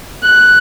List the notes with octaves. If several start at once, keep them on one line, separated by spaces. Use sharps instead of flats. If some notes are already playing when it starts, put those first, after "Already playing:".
F#6